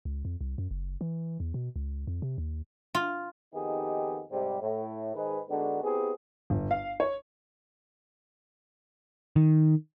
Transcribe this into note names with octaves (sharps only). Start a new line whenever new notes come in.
C#2
F2
C2
F#2
F#1
E3
E2
B2
C#2
F2
C3
D#2
F4
F2 D#3 B3 D#4 G4 G#4
G#2 C3 G3
A2
G#2 D#3 G#3 G#4 B4
D3 G#3 B3 D4 D#4 F#4
B3 C4 E4 G4 G#4
G1
F5
C#5
D#3